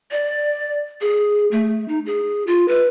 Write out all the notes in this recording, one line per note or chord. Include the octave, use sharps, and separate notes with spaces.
D5
G#4
A3
D#4
G#4
F4
B4